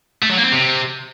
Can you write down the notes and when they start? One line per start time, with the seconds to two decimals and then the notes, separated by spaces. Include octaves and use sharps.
0.22 A3
0.30 F#3
0.37 A#3
0.44 C4
0.52 C3